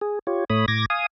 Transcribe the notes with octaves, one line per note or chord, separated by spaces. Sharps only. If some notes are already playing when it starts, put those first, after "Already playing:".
G#4
F4 G4 C#5
A2 A3 C#5 B5 D#6
A2 D6 G#6 A#6
F5 G#5 D#6